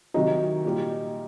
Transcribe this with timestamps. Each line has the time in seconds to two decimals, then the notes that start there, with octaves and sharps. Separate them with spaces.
0.14 C3 D#3 F#3 D#4
0.64 A#2 G3